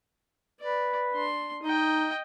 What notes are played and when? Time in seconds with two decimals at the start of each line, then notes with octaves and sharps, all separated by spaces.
0.61 B4 D5
1.12 D4 C6
1.63 D#4 D#5 G5